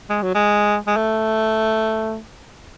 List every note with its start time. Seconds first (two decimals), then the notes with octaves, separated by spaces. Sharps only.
0.09 G#3
0.23 F#3
0.35 G#3
0.87 G#3
0.97 A3